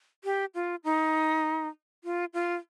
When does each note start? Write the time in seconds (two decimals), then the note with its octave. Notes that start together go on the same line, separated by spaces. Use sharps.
0.24 G4
0.55 F4
0.84 D#4
2.04 F4
2.34 F4